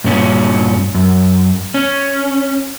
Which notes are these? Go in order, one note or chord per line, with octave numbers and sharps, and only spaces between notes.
G2 A#2 C#4
F#2
C#4